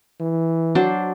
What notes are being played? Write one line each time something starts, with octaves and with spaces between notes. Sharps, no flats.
E3
F#3 D4 C5